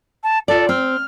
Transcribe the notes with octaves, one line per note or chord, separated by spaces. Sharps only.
A5
F4 A4 D5
C4 F6